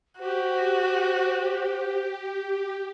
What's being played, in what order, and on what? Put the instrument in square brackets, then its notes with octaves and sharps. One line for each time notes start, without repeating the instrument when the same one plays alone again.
[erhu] F#4 [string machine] G4 [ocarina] C5